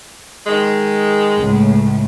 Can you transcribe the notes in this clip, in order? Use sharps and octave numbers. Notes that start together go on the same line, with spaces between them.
D#3 G#3
C#2 A2